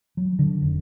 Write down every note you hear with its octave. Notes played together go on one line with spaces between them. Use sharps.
F#3
D3
F1